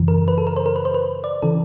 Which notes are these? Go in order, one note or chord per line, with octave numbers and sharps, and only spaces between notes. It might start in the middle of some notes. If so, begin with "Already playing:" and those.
Already playing: F#2 C#3 E3
A#4
B4
A4
A#4
C5
A#4
B4
C5
B4
D5
C#3 E3 A4